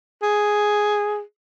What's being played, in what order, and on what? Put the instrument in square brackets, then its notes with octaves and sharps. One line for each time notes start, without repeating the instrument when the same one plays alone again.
[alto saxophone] G#4